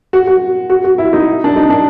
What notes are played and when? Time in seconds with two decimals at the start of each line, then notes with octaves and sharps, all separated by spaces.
0.13 F#4
0.27 F#4
0.70 F#4
0.84 F#4
0.98 E4
1.13 D#4
1.44 D4
1.56 D#4
1.70 D4